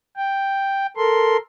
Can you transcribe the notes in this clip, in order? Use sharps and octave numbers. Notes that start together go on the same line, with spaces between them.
G5
A4 A#4 C6